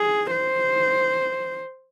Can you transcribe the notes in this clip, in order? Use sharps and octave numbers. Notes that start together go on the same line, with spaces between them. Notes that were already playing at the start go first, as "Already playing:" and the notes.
Already playing: G#4
C5